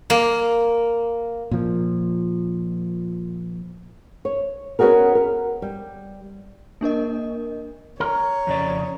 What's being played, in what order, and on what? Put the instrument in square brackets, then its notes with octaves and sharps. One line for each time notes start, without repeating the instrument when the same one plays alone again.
[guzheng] A#3
[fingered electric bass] A#2 F3
[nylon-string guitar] C#5
B3 C#4 D#4 F#4 G#4 A#4
A#4
G3
[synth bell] A#3 D4 A#4 D#5
[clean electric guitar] A#4 [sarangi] C#5
[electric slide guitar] F2 C#3 D5